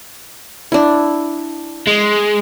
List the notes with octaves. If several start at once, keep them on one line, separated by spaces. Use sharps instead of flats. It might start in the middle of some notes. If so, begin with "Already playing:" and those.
D4 E4
G#3